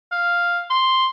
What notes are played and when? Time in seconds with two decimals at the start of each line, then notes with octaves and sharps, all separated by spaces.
0.12 F5
0.70 C6